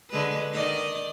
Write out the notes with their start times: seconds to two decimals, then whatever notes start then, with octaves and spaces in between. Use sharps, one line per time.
0.10 D3 G#3 B4
0.52 D#3 D5 D#5